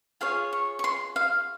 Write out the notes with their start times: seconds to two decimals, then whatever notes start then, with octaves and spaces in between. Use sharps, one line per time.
0.21 F4 G#4 C#5 F5
0.53 C#6
0.79 C#6
0.84 C6
1.16 F5